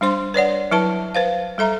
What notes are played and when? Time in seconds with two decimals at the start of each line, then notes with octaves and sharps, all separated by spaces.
0.01 G3 D4 C5 C6
0.34 B4 C#5 D5 F#5
0.71 F#3 E4 B4 A5
1.15 B4 C5 F5
1.58 G3 A4 E5 A#5